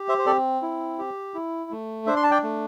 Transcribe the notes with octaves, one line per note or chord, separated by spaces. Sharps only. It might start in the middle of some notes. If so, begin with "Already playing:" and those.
Already playing: G4
C5 E5
C5
C4 A4 D5
E4
G4
E4
A3
D4 C5 E5
C6
A5
D5 G5
A3